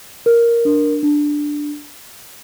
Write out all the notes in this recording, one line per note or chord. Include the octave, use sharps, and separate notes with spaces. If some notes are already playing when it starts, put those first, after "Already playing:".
A#4
D4
D4